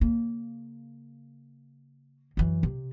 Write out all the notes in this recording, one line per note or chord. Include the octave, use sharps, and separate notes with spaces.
C#3 A#3
F#2 E3
C3